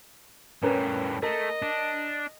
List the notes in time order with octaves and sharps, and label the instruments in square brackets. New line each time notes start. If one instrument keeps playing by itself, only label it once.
[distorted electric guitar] A2 G3 [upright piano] C#4 A#4 B4
[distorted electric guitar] A3 [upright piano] A#4 [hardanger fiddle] D#5
[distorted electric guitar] D4